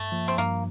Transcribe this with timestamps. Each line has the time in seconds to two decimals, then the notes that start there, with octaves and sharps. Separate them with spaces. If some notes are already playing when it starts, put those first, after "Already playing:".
Already playing: G2 A3
0.12 F3 A#3
0.28 C4
0.38 G2 A#3